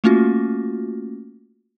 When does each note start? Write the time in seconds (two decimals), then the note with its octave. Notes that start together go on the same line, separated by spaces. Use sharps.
0.04 A3 A#3 C#4 F4 F#4